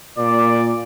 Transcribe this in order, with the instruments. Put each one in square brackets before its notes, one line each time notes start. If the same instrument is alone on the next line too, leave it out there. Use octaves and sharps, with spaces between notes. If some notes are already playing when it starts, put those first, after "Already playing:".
[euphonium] A#2 [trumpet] D5